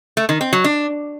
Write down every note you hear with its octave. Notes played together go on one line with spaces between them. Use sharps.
A3
D#3
C4
F#3
D4